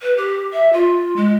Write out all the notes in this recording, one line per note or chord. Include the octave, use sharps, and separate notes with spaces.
B4
G4
E5
F4
G#3